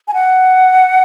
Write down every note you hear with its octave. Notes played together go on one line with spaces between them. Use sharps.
G#5
F#5